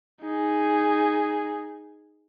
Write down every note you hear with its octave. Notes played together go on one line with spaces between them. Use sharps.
D#4 G#4